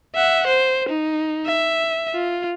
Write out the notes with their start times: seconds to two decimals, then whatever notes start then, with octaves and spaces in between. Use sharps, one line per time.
0.15 E5 F#5
0.47 C5
0.89 D#4
1.46 E5
2.14 F4